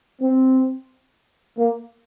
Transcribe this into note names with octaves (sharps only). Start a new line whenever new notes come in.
C4
A#3